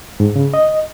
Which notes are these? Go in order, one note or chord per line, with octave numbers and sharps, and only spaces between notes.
G#2
C#3
D#5